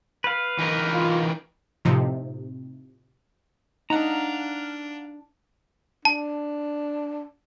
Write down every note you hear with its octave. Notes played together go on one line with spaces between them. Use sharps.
B4 F5
E3 D#4 A#4
F4
A2 C3 F3 D#4
D4 D#4 F5 F#5 A#5
D4 A5